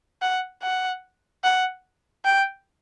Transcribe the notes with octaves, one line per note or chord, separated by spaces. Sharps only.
F#5
F#5
F#5
G5